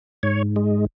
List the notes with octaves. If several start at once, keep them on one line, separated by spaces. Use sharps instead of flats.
G#2 C#5
G#3